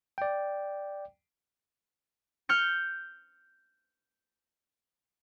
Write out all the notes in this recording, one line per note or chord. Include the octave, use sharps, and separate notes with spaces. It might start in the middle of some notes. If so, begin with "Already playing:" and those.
D5 G5
F6 G6 C#7